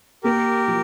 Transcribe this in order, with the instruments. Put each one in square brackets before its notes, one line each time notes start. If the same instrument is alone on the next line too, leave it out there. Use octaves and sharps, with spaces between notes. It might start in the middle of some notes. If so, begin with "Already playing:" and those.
[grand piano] A#3 [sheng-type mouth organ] G4 A#4
[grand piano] F3